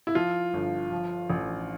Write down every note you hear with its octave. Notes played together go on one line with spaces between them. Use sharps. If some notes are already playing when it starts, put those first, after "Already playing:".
E4
F3 F4
G1
F3
A1